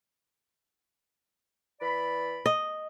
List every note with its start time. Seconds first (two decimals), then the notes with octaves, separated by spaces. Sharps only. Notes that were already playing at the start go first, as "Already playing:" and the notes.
1.81 E3 D5 B5
2.46 D#5